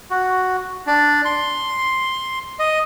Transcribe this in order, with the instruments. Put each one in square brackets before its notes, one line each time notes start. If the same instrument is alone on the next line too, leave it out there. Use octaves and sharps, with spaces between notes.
[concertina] F#4
D4
C6
D#5